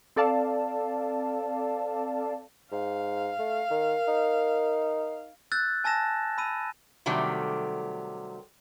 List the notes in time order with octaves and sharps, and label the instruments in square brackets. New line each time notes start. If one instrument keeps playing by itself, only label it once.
[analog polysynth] C4 A4 D5 F5 A5
[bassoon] G#2 [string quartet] F5
[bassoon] A3
[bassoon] D#3 [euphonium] A#4
[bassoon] D#4
[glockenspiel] E6 F#6 G6 A6
G#5 A5 E6 A#6 E7
B5 E6 D#7
[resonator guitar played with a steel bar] C3 D#3 F#3 G3 A3